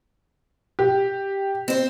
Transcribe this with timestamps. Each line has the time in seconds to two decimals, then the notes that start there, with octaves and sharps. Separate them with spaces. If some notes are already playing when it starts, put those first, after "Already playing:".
0.79 G4
1.68 C4 C5